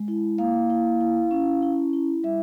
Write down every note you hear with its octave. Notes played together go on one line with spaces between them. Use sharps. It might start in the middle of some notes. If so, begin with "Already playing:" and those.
Already playing: G#3
E4
A#3 F5
E4
E4
C#4
E4
E4
G3 E5